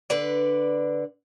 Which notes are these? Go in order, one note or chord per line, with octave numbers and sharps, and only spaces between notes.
D3 B4 D5